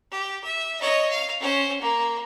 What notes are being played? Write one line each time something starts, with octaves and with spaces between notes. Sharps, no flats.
G4
E5
C#5 D#5
F5
C#4 C5
A#3